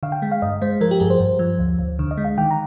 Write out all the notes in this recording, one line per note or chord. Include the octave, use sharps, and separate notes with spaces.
D3 F5
G5
G#3
F5
G2 D#5
G#3 C5
F3 A#4
G4
G2 G#4
C5
G2
F3
D2
D2
D3
D#5
G#3
F5
D#3 G5
A#5